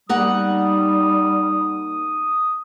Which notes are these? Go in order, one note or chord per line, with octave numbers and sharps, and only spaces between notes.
G3 A#3 D#4 F#5 D#6